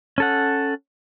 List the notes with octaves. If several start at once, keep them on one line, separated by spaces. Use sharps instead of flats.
C#4 A4 F#5